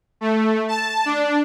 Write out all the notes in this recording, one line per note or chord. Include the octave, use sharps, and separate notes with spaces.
A3
A5
D4